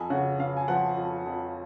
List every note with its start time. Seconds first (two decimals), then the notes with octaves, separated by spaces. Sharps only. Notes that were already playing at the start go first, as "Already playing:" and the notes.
Already playing: F2 G#5
0.10 C#3 F#5
0.39 C#3 F5
0.57 G#5
0.68 F3 F#5
0.97 F2
1.26 F2